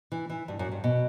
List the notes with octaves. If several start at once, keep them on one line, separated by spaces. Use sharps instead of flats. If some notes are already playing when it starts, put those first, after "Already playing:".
E3
E3
G2
F#2
G2
B2